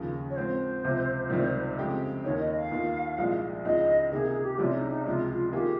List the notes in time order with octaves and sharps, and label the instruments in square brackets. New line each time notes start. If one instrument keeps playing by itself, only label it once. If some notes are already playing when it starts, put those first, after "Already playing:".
Already playing: [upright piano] D#2 C#3 F3
[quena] C#5
[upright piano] G#2 F3 C4 [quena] C5
[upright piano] C#2 C3 F3
C#2 C3 D#3 G3
F2 C#3 G#3 C4 G4
[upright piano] D#2 D#3 A#3 D#4 [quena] C#5
[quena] D#5
F5
[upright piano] D#2 D#3 A#3 F4 A#4
C2 A#2 F3 G#3
[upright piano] C#2 C#3 G#3 D#4 [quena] D#5
[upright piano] C3 D#3 A#3 D#4 [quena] G#4
[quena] G#4
G4
[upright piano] C2 C3 G3 C#4 G#4 [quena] F4
[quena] D#4
D#4
[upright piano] C#2 C3 F3 G#3 [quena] F4
[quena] F4
[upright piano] D#3 A#3 F4 G#4 [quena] G4